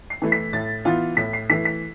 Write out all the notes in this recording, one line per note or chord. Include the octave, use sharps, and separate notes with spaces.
C7
E3 A3 E4
B6
A2 A6
E3 B3 F4
A2 B6
C7
E3 A3 B6
B6